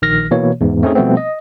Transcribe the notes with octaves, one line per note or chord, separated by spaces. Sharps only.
A#1 D#3 F6 A#6
B2 E3 A#3 C#5
E2 G#2
A3 C4 C#4 D#4 G#4
B2 F3 G3 A3 B3 C4
D#5